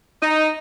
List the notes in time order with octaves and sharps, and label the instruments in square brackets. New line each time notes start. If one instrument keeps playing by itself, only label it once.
[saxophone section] D#4